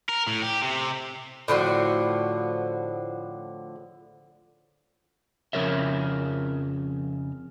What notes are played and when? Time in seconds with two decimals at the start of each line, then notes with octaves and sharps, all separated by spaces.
0.09 A#4
0.27 A2
0.42 G4
0.62 C3
1.48 A2 D3 F3 F#4
5.53 F2 C#3 F3 A#4 C#5 E5